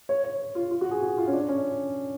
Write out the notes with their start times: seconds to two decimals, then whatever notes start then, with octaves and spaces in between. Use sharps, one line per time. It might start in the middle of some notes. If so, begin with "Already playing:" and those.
0.09 C#5
0.24 C#5
0.55 F4
0.71 F4
0.81 F#4
0.91 G#4
1.02 F#4
1.18 F4
1.27 C#4
1.33 D4
1.49 C#4